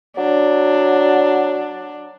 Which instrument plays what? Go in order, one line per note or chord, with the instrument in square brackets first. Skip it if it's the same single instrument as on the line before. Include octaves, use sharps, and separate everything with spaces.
[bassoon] F#3 [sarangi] D4